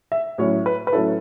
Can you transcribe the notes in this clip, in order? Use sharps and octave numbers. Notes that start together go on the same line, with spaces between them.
E5
A2 F#3 C#4 E4 C#5
B4
B4
A2 F#3 C#4 E4 A4